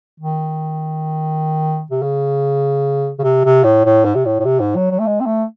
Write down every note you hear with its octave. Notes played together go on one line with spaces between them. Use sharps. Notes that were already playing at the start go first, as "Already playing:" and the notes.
D#3
C3
C#3
C#3
C3
C3
A2
A2
G#2
C3
A2
A2
C3
G#2
F#3
F#3
A3
G#3
C4
A3